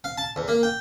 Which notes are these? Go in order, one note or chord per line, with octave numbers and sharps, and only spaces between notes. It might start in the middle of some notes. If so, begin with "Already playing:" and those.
F5
A5
E2
A#3
G5